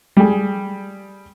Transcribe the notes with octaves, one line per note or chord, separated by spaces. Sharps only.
G3 G#4